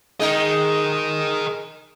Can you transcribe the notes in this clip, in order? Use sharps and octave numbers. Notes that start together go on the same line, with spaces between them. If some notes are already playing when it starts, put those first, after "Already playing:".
G#3 D#4 A#4 D#5